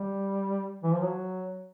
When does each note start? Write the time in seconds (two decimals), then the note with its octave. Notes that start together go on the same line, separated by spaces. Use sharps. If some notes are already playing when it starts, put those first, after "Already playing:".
Already playing: G3
0.83 E3
0.92 F3
1.02 F#3